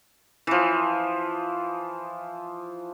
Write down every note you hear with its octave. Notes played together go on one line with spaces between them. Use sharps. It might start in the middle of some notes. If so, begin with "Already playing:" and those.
E3 F3